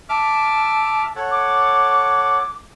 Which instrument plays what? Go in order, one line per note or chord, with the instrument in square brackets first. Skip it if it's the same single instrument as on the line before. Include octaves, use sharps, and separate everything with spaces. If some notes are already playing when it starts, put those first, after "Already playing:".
[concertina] E5 D6 F6 [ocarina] A5
[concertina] A4 C#5 F#5
[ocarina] D6